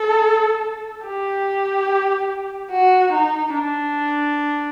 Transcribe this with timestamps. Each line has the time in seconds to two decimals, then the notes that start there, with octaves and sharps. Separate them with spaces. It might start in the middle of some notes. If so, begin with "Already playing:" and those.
Already playing: A4
1.07 G4
2.71 F#4
3.13 D#4
3.54 D4